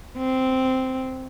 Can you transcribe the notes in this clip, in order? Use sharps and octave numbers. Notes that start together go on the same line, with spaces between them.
C4